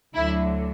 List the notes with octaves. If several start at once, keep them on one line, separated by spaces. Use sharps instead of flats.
D2 D3 F#3 E4